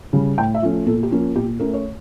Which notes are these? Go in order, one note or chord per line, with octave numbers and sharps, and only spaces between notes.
C#3 G3
A2 G5
E5
F3 A3 C#4
A#2 A4
G4
F3 A#3 C#4
A#2 G4
A3 C#4 A#4
C#5